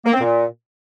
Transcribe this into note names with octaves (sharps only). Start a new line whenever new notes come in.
A#3
C4
A#2